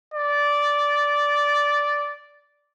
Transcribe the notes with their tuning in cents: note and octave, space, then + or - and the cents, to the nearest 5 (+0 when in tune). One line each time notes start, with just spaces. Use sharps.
D5 -10